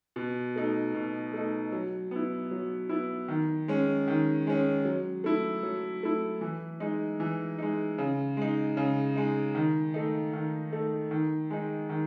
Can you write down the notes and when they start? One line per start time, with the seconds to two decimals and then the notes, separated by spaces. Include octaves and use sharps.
0.16 B2
0.56 A3 D#4
0.94 B2
1.33 A3 D#4
1.72 F#3
2.11 B3 E4
2.51 F#3
2.89 B3 E4
3.28 D#3
3.68 G#3 C#4
4.08 D#3
4.47 G#3 C#4
4.85 F#3
5.24 A3 E4
5.63 F#3
6.03 A3 E4
6.41 E3
6.80 G#3 D#4
7.20 E3
7.59 G#3 D#4
7.98 C#3
8.37 G#3 D#4
8.77 C#3
9.16 G#3 D#4
9.55 D#3
9.94 A3 D#4
10.33 D#3
10.72 A3 D#4
11.11 D#3
11.50 G#3 D#4
11.89 D#3